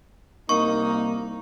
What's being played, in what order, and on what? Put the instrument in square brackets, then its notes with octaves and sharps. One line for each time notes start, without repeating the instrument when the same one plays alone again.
[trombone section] C2 A#3 [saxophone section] D#4 [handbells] C#6